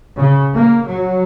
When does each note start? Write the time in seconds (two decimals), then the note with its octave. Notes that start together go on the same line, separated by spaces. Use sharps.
0.17 C#3
0.53 A#3
0.86 F#3